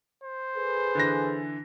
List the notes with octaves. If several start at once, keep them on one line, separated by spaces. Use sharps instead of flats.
C5
G#4 A4 B4
D3 E3 A#6